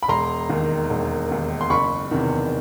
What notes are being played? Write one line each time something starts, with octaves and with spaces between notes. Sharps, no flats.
B5
E1 A#5 C6
D#2 D#3
E1
D#2 D#3
C6
F#1 B5 C#6
E2 C3 D#3